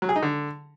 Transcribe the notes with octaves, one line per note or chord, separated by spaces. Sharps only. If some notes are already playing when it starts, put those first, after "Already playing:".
F#3
G#4
D#4
D3